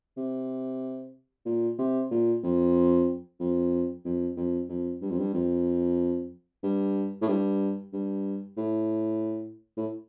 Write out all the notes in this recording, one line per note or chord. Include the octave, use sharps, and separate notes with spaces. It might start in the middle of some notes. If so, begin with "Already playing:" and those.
C3
A#2
C3
A#2
F2
F2
F2
F2
F2
G2
F2
G2
F2
G2
A2
G2
G2
A2
A2